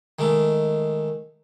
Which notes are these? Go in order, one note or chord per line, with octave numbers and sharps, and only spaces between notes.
D#3 G#3 A3 D6